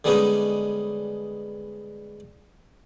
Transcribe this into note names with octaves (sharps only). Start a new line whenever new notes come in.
D3 G3 G#3 B3 C#4 D#4